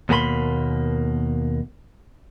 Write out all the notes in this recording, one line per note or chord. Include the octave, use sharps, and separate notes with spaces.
D#2 B2 A#3 G4 B5 C6